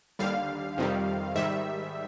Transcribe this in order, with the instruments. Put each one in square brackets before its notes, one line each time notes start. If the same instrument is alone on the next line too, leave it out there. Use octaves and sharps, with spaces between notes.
[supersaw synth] D#2 D3 G3 F5
F2 C3 D#3 G3
G#2 D#3 G3 E5